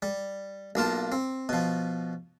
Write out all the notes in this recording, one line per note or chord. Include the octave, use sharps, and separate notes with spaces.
G3
B1 A#3 F4 A5
C4
B2 F3